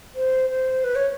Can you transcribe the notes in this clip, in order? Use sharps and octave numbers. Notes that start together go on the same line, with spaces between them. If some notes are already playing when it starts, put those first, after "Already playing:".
C5
C5
B4
C#5